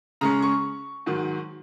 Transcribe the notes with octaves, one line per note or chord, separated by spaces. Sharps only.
C#3 G#3 C#4 A#5
C#6
G#2 D#3 F#3